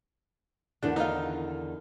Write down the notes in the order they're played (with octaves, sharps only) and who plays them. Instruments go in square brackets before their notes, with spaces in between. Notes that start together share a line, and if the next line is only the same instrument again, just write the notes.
[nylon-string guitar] E2 D3 D#3 [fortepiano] D4
[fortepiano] D#4 F4